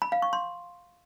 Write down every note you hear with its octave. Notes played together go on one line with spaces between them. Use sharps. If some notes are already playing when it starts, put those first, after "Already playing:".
B5
F5
C#6
C6